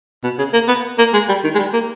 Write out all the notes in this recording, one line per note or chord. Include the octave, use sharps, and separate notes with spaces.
B2
C#3
A#3
B3
A#3
G#3
G3
D#3
G#3
G3
A#3